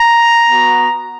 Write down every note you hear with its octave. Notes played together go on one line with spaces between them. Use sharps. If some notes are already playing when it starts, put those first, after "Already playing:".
Already playing: A#5
B3 F#4